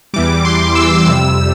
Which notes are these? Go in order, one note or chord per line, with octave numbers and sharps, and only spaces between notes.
E2 E3 G3 D6
C6
E6
F2 C3 G3 E6